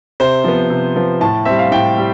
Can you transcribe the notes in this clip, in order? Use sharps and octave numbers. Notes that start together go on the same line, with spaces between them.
C3 C5
F3 B3
C3
F3 B3
A2 A5
G3 C4 E5
F5
A2 G5
G3